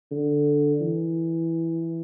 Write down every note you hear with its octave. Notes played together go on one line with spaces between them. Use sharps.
D3
E3